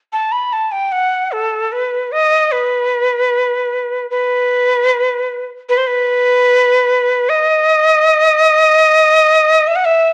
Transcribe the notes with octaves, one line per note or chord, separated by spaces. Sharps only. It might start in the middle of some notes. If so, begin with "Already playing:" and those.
A5
B5
A5
G5
F#5
A4
B4
D#5
B4
B4
B4
C5
B4
D#5
E5
F#5
E5